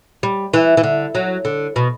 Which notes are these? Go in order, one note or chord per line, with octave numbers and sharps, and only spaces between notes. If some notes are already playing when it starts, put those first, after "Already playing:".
G3
E3
E3
D3
F#3
D3
B2